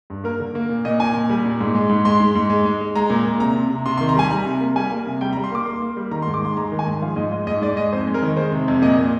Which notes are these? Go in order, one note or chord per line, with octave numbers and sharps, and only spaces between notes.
G2
A#3 A#4
D3
A#3
A#2
A#2 D#5
A#2 G#5
A#2
G3
A#2
G#2
G#3
G#2
G#3 C6
G#2
G#2
G#3
G#3
G#3
G#3 A#5
A#2
A#2
C3 A#5
C3
C3
C3 C6
C6
D#3
A#5
G3 G#5
G3 A#5
C3
A#3
G3 G#5
A#3
C3
G3 G5
A#5
G3
C6
A#3 D6
A#3 C6
A#3
G3
D#3 A#5
C6
G#2
D6
G#3 C6
G#3 A#5
D#3
G#5
G#2
F3 F5
G#2 D#5
G#2 D#5
G#2 D#5
G#2 D5
G#3 D#5
F2 C5
G#3
A#4
D#3
G#3 C5
C3
F2
A#2 D#5
A#2